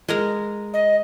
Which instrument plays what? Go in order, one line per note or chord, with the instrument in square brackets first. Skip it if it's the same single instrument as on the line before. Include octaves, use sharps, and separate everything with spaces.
[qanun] G#3 A#4 A#5
[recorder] D#5